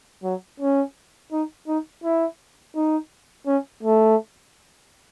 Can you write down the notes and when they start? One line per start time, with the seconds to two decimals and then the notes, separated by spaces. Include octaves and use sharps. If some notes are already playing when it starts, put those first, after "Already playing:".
0.24 F#3
0.60 C#4
1.32 D#4
1.67 D#4
2.04 E4
2.75 D#4
3.46 C#4
3.83 A3